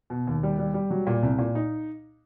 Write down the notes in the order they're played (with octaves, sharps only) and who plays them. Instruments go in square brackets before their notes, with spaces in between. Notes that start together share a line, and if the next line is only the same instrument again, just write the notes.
[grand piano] B2
D#2
G3
G3
G3
F#3
A#2
C2
A#2
D#4